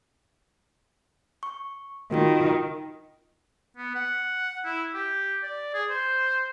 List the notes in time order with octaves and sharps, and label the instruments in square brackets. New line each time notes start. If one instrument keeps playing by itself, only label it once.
[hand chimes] C#6
[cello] D#3 [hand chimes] F4 F#4 A#4
[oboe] B3
F#5
E4
G4
D5
G#4
C5